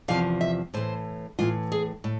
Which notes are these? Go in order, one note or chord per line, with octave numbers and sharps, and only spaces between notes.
E2 C3 F3 F5
E5
A2 E3 C5
A2 E3 F4
G#4
A2